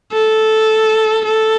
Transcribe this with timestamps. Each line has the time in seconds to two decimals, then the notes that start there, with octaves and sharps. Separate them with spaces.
0.12 A4
1.25 A4